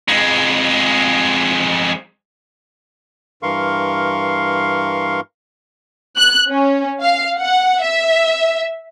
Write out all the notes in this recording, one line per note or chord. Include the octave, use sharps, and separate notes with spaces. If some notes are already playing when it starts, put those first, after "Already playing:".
F2 G#3
G2 E3 A#4 F5 C6 C#6
F#6
C#4
F5
F#5
E5